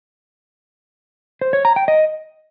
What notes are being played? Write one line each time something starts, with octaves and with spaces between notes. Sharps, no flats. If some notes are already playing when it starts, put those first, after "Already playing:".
C5
C#5
A#5
G5
D#5